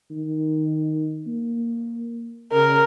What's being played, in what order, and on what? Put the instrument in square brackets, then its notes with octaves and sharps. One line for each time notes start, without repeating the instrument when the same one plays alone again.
[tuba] D#3
A#3
[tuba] C#3 [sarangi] A#4